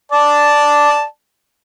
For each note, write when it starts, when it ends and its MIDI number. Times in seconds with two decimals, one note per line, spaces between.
0.12 1.04 74
0.12 1.04 81